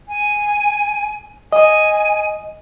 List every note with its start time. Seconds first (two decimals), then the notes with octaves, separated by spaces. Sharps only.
0.08 G#5
1.53 D#5 G#5